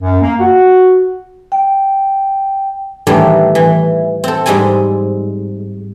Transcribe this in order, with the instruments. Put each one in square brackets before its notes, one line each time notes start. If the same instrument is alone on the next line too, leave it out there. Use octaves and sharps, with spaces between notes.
[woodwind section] F#2
A#3
F#4
[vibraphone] G5
[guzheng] A2 D#3 E3 G3 A3
E3
C4 A4
G#2 G3 G#3 C4 G#5